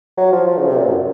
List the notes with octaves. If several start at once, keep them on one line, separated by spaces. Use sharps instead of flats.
F#3
F3
F3
C#3
C3
A#2
F#2